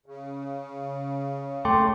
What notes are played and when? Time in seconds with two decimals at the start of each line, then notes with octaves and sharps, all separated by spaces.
0.06 C#3
1.65 A3 G5 C6 D6